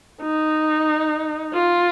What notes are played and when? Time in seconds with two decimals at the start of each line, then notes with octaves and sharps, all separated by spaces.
0.22 D#4
1.54 F4